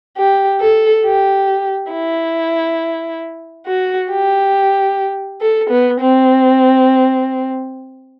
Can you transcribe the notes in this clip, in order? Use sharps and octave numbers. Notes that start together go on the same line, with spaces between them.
G4
A4
G4
E4
F#4
G4
A4
B3
C4